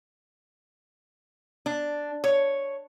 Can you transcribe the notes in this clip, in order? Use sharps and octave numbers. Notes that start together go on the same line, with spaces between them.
D4
C#5